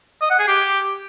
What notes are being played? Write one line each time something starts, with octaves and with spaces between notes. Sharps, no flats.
D#5
F#5
G#4
G4